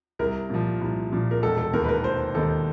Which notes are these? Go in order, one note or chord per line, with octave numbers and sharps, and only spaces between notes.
C2 A#4
A#2 F3
C2
A#2 F3
A#4
E1 A4
A4
D#2 D#3 A#4
B4
A#4
E1 C5
D#2 D#3 A4